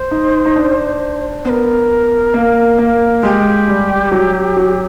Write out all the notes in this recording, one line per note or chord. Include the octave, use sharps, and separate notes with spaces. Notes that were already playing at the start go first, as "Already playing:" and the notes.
Already playing: C5
D#4
D#4
D4
B3 A#4 C5
A#3
A#3
G#3 G4
G3
F#3
F#3